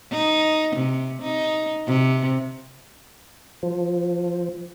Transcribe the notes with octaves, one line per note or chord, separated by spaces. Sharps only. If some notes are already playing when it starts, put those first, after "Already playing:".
D#4
C3
D#4
C3
F3